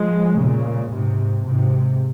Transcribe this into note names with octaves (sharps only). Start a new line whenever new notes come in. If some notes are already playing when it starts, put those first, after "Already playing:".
Already playing: F3 G#3
A#2 C#3
G#2 C3
G#2 C3